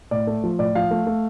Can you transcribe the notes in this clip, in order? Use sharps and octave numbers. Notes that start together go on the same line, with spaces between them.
A2 D5
A3
F3
A2 D5
F3 F5
A3
A3